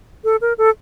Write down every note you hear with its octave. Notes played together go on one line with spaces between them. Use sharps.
A4
A#4
A4